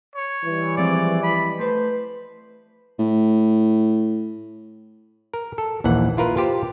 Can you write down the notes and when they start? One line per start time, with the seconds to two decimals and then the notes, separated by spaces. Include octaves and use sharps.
0.16 C#5
0.45 E3 G3
0.77 F3 G#3 C4 D5
1.23 D#5 B5
1.59 A3 B4 C5
2.99 A2
5.33 A#4
5.58 A4
5.84 A#1 D#2 E3 F#5
6.17 E4 F4 A#4 B4
6.37 F4 G4 C5